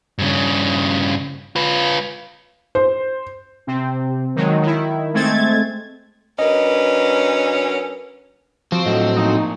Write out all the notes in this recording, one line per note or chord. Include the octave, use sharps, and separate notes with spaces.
G2 C#3
F4 B4
C5
C3 C4
D#3 F#3 G#3
D#3 E4
G#3 A3 C4 G#6 A6
F#3 C#4 D4 A#4 B4 D#5
F3 C4 F#4
A2 F#3 D4 A4 D#5
F3 A#3 D#4